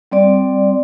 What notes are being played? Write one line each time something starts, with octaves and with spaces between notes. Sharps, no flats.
G3 C4 D5